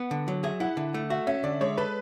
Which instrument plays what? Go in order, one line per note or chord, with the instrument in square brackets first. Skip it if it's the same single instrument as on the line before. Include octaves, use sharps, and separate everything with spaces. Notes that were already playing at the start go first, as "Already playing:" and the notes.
Already playing: [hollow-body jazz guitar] B3 [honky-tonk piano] F#5
[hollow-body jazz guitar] D3
F#3
[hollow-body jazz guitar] G#4 [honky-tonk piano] E5
[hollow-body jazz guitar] E4 [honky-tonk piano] F#5
[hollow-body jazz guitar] D3
A3
[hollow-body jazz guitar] F#4 [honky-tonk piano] E5
[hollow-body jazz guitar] C#4 [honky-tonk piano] E5
[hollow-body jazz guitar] D3 [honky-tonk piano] D5
[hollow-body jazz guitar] G#3 [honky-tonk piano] C#5
[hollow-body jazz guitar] A4 [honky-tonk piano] B4